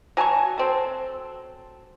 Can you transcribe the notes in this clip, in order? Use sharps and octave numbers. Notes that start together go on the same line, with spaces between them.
F#3 G#5 A5 C#6
F#3 C4 A4